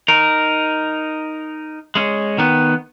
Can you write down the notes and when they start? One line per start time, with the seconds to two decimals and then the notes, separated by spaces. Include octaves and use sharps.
0.08 D#4 A#4
1.95 G#3 C#4
2.38 D#3 B3